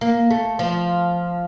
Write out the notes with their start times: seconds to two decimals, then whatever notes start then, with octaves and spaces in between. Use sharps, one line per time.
0.01 A#3
0.31 A3
0.59 F3